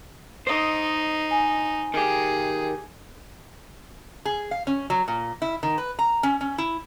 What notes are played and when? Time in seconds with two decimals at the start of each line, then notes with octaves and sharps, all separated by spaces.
0.47 D#4 C5 D#5
1.31 G#5
1.94 D#3 G4 G#4
4.25 G#4
4.51 F5
4.67 C#4
4.90 F#3
5.08 A#2
5.42 E4
5.63 D#3
5.78 B4
5.99 A#5
6.23 C#4
6.41 C#4
6.58 E4